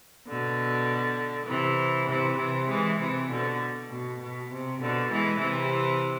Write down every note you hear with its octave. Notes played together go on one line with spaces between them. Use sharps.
B2 D3
C3 E3
C3 E3
C3 E3
E3 G#3
C3 E3
B2 D3
B2
B2
C3
B2 D3
E3 G#3
C3 E3